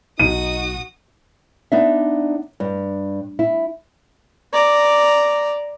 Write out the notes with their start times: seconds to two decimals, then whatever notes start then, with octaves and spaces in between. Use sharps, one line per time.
0.19 B1 D#4 F#4 D#6 D#7
1.72 B3 D4 D#4 D5 E5
2.60 G2
3.39 E4
4.53 D5 A#5